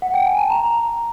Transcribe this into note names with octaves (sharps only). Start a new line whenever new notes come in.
F#5
G5
G#5
A5
A#5